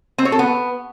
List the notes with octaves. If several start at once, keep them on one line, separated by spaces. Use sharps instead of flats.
C4
C#5
A4
B3